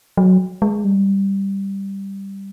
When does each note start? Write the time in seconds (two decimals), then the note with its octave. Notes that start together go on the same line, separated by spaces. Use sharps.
0.17 F#3
0.62 G#3
0.84 G3